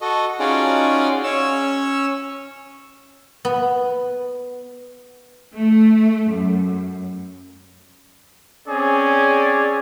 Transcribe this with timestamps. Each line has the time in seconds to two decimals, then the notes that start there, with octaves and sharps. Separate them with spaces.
0.01 F#4 A4 D#5
0.40 C#4 D#4 F4 F#4 G#4 D5
1.24 C#4 C#5 E6
3.45 B3
5.55 A3
6.29 F#2
8.68 C4 C#4 G#4 D5